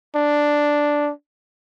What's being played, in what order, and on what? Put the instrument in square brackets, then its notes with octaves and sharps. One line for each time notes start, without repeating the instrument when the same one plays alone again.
[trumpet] D4